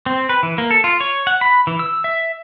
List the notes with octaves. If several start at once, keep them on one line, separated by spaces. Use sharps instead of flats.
C4
B4
E3
A#3
A4
F4
C#5
F#5
B5
E3
E6
E5